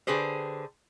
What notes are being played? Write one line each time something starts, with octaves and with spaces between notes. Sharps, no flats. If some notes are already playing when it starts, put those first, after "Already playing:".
D3 G4 G#4 B4 C5